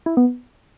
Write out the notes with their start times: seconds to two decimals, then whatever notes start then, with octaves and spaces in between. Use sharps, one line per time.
0.06 E4
0.17 B3